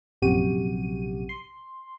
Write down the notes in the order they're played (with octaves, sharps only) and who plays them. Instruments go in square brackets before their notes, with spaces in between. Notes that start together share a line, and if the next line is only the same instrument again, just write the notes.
[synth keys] A#1 F#2 C3 F#4 G4 D#7
C6